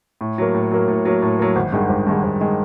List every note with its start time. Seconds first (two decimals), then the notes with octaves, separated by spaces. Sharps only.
0.21 A2
0.38 F#3 A#3
0.54 A2
0.71 F#3 A#3
0.88 A2
1.05 F#3 A#3
1.22 A2
1.39 F#3 A#3
1.56 G#1
1.72 G2 D#3 G#3
1.89 G#1
2.07 G2 D#3 G#3
2.23 G#1
2.41 D#3 G#3